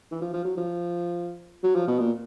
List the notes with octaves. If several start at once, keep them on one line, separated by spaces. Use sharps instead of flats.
E3
F3
F3
F#3
F3
F#3
F3
B2
A#2